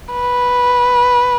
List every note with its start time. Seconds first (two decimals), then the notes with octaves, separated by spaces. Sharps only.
0.14 B4